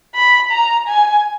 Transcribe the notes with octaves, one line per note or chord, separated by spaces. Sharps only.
B5
A#5
G#5